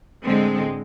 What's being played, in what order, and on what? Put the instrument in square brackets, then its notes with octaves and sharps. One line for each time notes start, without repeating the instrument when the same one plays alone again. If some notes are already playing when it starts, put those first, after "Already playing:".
[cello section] A2 D3 G#3 C4